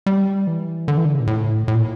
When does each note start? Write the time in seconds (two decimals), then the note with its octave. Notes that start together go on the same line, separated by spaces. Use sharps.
0.06 G3
0.47 E3
0.88 D3
0.97 E3
1.05 D3
1.13 C#3
1.20 A#2
1.27 A2
1.68 A2
1.75 A#2